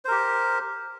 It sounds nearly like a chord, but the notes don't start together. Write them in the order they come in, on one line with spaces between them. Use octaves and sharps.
C5 A#4 G4